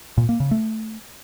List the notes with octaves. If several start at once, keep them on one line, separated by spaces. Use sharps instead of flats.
A#2
A#3
C#3
A3